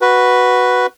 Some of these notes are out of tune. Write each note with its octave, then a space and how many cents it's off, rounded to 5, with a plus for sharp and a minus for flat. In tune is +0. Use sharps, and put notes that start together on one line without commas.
F#4 +0 B4 +0